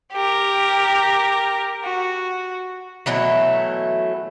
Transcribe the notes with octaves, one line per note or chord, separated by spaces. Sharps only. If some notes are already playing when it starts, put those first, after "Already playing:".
G4 A#4
F#4
B2 E3 F#3 A3